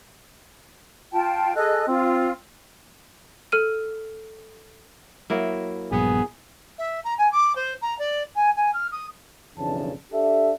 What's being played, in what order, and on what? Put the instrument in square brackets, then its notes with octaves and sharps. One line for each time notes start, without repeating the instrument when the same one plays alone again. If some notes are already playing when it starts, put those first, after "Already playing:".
[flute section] F4 G5 A5
[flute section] G#4 D#5 F#6 [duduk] A4
[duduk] C4 [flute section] F4
[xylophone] A4 F6 D#7
[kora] F#3 A#3 E4
[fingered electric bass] A#1 G2 [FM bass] B3 [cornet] G#4
[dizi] E5
A#5
G#5
D6
C5
A#5
D5
G#5
G#5
F6
D#6
[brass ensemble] B1 F2 C#3 E3 D4 A5
D4 G4 A4 E5